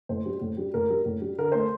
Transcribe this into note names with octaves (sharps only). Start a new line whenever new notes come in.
A2 C5
G3
A2
G3
A2 A#4
G3
A2
G3
D3 A#4
A3 C5